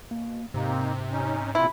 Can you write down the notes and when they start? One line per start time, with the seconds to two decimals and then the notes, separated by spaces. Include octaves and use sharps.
0.11 B2 A#3
0.54 G#2 C3 A#3 C4 D#4
1.11 C#4 D#4
1.55 E2 A#2 E4 F4